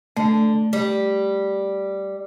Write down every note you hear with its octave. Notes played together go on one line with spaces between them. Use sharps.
D3 A3
G3